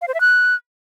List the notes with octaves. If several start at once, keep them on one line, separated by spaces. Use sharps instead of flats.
F5
C5
E5
F#6